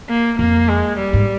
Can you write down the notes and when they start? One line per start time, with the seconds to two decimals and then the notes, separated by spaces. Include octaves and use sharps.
0.09 A#3
0.38 F2 A#3
0.68 G#3
0.98 G3
1.13 G#2